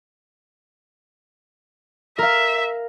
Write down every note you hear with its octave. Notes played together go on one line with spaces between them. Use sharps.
A#4 E5 F5